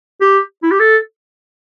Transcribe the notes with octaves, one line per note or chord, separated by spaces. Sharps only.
G4
E4
G4
A4